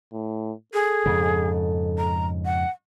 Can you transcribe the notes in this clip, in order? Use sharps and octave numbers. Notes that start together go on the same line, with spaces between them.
A2
G#4 A4
F2 G#2 C#3
A#5
F#5